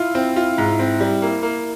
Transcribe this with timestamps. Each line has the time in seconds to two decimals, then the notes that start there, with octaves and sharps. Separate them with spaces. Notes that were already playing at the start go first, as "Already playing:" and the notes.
Already playing: E4 F4
0.15 C4
0.36 F4
0.58 G#2
0.80 C4
1.00 G3
1.22 A#3
1.43 A#3